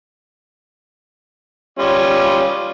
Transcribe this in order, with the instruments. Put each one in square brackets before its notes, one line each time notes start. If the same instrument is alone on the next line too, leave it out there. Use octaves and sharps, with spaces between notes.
[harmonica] G3 C#4 F4